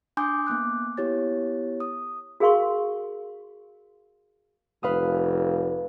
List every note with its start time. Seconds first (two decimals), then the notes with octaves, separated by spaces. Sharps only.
0.17 D4 G#5 C6 D6 D#6 G6
0.47 A#3 B3 D6 F#6
0.97 B3 E4 G4 C#5 A6
1.80 D#6
2.40 F#4 G#4 A#4 F5 C6 C#6
4.83 F1 B4 F5 D#6